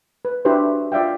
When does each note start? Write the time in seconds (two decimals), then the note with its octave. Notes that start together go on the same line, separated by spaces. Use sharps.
0.25 B4
0.45 D4 E4 F#4 G4 B4 C5
0.92 F4 D5 E5 F5 G5